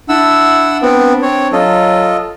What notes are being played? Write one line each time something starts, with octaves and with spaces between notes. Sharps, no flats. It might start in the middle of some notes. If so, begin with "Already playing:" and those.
D4 E4 F#5 E6
B3 C4
C4 C#5
F#3 F4 A4 D#5